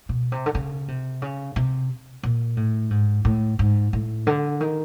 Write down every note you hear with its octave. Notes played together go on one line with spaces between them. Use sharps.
B2
C3
D3
C#3
C3
C#3
C3
A#2
A2
G#2
A2
G#2
A2
D3
D#3